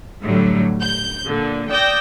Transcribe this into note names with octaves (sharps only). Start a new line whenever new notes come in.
A2 D3 F#3 G3
G6
A#2 D3
D5 G5 D#6 E6 G6 A#6